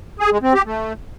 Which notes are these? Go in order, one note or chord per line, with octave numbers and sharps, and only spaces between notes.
G#4
G#3
C4
G4
A3